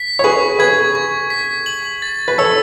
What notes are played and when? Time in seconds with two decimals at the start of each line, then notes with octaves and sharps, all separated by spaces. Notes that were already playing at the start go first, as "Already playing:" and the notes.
Already playing: B6
0.19 C#5
0.24 G#4 B4 C#6
0.59 G#4 B4 G#6
0.95 C#6
1.30 B6
1.66 F#7
2.02 A6
2.28 B4
2.38 A4 C#5 E6